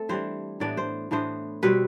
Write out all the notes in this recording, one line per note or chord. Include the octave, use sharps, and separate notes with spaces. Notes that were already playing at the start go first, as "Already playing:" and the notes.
Already playing: A3 C4 A4
E3 G3 D4 C5
A2 E3 B3 D4 D5
C5
A2 E3 B3 D4 C5
B2 G3 C4 B4